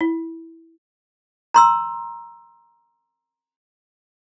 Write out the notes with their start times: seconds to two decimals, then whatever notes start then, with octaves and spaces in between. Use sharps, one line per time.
0.01 E4
1.54 A#5 C6 E6